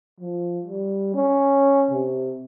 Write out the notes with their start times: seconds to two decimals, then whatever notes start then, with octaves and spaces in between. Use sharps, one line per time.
0.20 F3
0.65 G3
1.14 C#4
1.91 C3